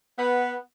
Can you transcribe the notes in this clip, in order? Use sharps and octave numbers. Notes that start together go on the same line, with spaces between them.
B3